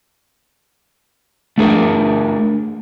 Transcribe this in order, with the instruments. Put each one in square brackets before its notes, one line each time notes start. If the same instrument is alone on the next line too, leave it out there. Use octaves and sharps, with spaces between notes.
[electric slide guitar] A3 D4 G#4 A#4